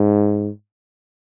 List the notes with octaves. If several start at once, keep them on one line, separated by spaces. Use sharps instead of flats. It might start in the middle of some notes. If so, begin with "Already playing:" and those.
Already playing: G#2